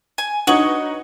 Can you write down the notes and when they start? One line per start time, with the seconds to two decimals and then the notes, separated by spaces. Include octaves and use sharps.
0.18 G#5
0.47 D4 D#4 F#4 B4 C#5 D#5 F#5 F#7